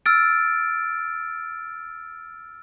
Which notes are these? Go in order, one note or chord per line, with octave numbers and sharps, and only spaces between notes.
E6 F6 A6 D7